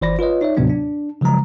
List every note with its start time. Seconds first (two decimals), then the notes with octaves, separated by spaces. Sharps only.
0.02 G1 E3 C5 D5 B5 A#6
0.19 F4 B4 C#5 D#5
0.41 D#4 C#5 D5 E5
0.57 D#2 A2 C3 F#3 B3 D4
0.70 D4
1.21 C#3 F3 F#3 G#3 A#5